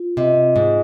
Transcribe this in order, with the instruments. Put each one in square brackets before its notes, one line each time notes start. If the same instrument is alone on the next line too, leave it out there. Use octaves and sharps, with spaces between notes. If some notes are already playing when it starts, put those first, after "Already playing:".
Already playing: [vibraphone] F4
[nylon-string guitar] C3 [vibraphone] D#5
[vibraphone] C4
[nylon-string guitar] G#2